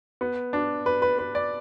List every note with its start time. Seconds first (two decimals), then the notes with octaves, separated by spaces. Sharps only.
0.21 B3
0.53 D4
0.86 B4
1.02 B4
1.19 B4
1.35 D5